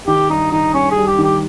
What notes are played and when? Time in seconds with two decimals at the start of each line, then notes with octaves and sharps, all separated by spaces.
0.07 D#3 G4
0.30 G2 D#4
0.52 D#3 D#4
0.74 G2 C#4
0.91 G#4
0.97 G3
1.07 G4
1.19 D#3 G4